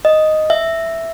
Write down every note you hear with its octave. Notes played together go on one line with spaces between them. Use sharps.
D#5
E5